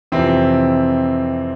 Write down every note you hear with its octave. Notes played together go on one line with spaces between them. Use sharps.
F2 C3 E3 C4